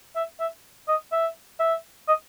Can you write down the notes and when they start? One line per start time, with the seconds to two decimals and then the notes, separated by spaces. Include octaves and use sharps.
0.16 E5
0.40 E5
0.88 D#5
1.12 E5
1.60 E5
2.08 D#5